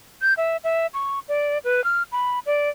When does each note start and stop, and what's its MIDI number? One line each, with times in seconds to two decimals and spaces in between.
0.22 0.34 91
0.37 0.57 76
0.64 0.87 76
0.94 1.19 85
1.29 1.58 74
1.64 1.84 71
1.84 2.03 89
2.12 2.39 83
2.46 2.69 74